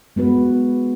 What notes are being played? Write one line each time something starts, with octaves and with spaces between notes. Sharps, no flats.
G#3 B3 F#4 B4